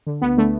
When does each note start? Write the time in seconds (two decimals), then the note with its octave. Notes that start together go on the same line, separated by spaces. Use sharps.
0.06 D3
0.22 D2 B3
0.37 D3 A3